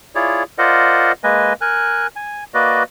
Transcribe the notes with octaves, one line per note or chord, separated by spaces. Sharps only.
E4 F4 G#4 C#5 D5
F4 A#4 C5 D5 D#5 F#5
G#3 A#3 B4 D#5 G#5
A#4 G#5 F#6
G#5
A#3 F#4 B4 D5 D#5